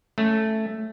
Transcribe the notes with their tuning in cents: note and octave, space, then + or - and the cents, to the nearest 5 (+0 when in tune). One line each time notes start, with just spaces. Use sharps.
A3 +0 C#4 -5